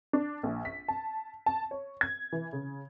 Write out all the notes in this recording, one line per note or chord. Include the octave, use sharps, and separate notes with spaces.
D4
A#1
B6
A5
A5
C#5
G#6
E3
C#3